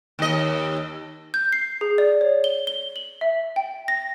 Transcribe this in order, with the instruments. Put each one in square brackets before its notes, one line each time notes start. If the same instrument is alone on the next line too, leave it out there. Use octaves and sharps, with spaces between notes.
[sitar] D#2 D#5
[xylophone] G6
C7
G#4
D5
C#5
G7
G7
F#7
E5
G5
A#6